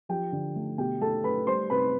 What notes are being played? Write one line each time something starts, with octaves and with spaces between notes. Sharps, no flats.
F3 G4 G5
D3
A3
B2 G4 G5
A3 A4 A5
A3 B4 B5
G3 C5 C6
C3 B4 B5